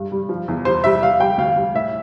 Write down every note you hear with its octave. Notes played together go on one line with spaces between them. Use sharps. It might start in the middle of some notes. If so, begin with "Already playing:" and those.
Already playing: G2
G3
F3
E2
G3 C5
G3 E5
G3 F5
G3 G5
D2 F5
G3
A2 E5